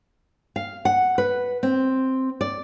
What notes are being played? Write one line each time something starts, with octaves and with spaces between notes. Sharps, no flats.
F5
F#5
B4
C4
D5